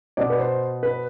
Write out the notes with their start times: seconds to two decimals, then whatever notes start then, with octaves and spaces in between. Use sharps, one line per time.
0.17 B2 D5
0.30 B4
0.40 C5
0.83 B4